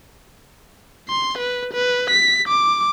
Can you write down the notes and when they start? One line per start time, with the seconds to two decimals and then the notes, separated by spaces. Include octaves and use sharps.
1.09 C6
1.38 B4
1.73 B4
2.10 B6
2.48 D6